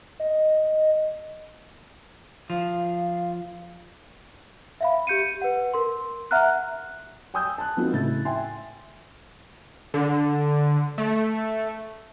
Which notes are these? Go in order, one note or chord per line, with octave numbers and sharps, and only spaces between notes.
D#5
F3 F5
E5 F5 B5
G4 G6 C#7 D#7
B4 F#5
A#4 C6
E5 F#5 A#5 F6 F#6
G5 G#5 D#6 E6 G6
A5 F#6
F3 B3 C4 D#4 F4 F#4
A2 C#3 E4 A6
E5 G5 G#5 C6
D3
A3